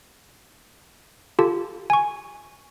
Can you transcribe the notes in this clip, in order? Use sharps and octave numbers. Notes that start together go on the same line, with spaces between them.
F4 G4 A4 A5
G#5 C#6